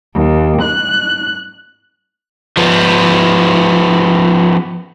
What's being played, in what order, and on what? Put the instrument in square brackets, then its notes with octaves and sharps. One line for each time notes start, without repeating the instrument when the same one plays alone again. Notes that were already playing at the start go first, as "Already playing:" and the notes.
[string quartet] D#2
F#6
[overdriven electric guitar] F3 B3